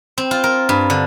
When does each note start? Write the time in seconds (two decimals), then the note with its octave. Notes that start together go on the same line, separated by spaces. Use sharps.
0.18 C4
0.31 F4
0.44 A#4
0.69 G2
0.90 D3